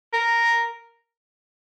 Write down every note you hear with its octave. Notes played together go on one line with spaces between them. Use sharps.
A#4